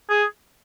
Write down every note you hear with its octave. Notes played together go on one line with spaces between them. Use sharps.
G#4